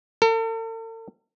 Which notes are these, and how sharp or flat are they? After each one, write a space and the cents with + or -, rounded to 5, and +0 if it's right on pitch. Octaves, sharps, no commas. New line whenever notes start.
A4 +45